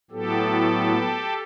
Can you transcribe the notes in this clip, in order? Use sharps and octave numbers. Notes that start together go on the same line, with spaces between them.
A2 F#3 B3 G4 A4